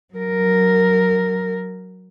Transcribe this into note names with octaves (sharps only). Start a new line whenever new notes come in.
F#3 A#4